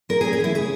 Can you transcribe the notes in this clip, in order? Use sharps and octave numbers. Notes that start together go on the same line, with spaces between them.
A#3 A#4
G#4
C#4
G#4
E3 E4
C#3 G#4